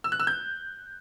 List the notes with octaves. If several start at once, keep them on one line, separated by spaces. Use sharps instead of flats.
E6
F#6
E6
G6